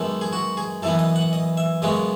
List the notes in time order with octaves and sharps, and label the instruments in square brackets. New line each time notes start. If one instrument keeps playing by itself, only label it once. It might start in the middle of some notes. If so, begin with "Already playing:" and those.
Already playing: [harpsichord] F#2 D#3 G#3 B3 A4
G#4
F#4
G#4
F#2 E3 B3 A4
D#5
F#5
D#5
E5
F#2 C#3 G#3 B3 D#5